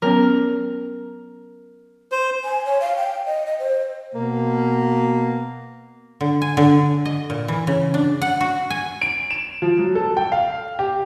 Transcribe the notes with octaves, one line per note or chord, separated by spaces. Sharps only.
F#3 B3 C#4 A#4
C5
G#5
C#5
F5
G5
D#5
D#5
C5
B2 A#3
D3
G#5
D3
D#5
A#2
E3
C#3
D4
F#5
F#4
G#5
D7
E7
F3
F#3
A4
G5
F5
G4